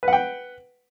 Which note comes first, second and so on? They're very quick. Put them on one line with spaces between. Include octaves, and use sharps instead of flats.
B4 F#5 G5